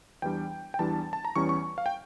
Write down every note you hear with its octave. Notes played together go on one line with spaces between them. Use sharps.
E2 E3 G3 D4 G5
G5
E2 E3 G3 D4 A5
A5
A#5
E2 E3 G3 C#4 C#6
C#6
F5
G5